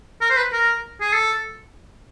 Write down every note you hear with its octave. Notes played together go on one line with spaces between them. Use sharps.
A#4
C5
B4
A#4
G#4
A4